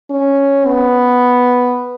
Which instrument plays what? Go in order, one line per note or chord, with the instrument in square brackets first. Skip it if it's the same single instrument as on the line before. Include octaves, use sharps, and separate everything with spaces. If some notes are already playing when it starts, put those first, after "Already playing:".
[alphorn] C#4
B3